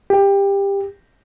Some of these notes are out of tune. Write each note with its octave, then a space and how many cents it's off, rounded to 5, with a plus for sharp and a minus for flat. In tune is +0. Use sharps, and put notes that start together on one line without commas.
G4 +20